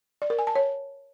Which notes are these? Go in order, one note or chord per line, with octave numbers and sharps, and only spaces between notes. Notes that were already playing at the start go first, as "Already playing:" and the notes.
D5
A#4
G#5
A5
C#5